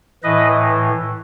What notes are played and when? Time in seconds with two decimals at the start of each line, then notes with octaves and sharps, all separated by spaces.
0.23 A2 E3 B4 D#5